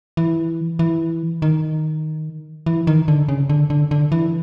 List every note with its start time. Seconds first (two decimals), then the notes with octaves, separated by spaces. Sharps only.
0.17 E3
0.79 E3
1.42 D#3
2.66 E3
2.87 D#3
3.08 D3
3.29 C#3
3.50 D3
3.70 D3
3.91 D3
4.12 E3